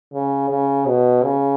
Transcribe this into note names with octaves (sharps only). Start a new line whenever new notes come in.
C#3
C#3
B2
C#3